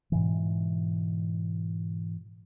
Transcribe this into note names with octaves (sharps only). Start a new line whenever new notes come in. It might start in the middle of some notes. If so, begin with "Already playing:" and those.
G#2 B2 E3